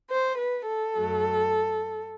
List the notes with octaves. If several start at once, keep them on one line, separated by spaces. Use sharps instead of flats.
C5
B4
A4
F#2 F#3 A3